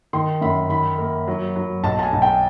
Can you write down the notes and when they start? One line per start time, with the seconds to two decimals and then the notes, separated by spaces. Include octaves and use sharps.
0.13 D#3 C6
0.41 F#2 B5
0.69 D#3 B5
0.98 A#3
1.27 F#3
1.56 F#3
1.83 B1 A5
1.99 A5
2.03 G#5
2.13 B1
2.22 G5